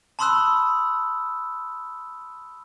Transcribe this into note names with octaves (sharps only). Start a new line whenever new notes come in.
A5 B5 C6 D#6 E6 F#6